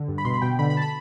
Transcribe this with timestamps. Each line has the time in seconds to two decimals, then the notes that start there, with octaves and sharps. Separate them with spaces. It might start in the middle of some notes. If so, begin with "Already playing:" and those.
Already playing: D3
0.08 G2
0.18 B5
0.25 B2 C6
0.34 B5
0.42 B2 G5
0.59 D3 B5
0.70 B5
0.77 A5
0.82 B5